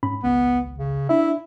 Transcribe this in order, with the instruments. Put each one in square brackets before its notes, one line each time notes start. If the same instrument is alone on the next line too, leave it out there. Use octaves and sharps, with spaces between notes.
[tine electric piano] G#2 C#4 B5
[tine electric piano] G#1 C#2 [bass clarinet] B3
[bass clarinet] C#3
[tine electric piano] D4 E5 [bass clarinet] E4